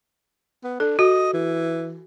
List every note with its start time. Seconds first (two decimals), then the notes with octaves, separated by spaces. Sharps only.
0.64 B3
0.80 D4 A4
0.99 F#4 D#5
1.34 E3